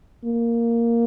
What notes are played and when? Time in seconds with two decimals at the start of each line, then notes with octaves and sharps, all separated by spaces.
0.24 A#3